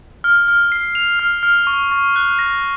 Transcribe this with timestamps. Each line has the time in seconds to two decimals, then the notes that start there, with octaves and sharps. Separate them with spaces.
0.24 F6
0.48 F6
0.72 C7
0.95 F7
1.19 F6
1.43 F6
1.67 C#6
1.91 C#6
2.16 F#6
2.39 A#6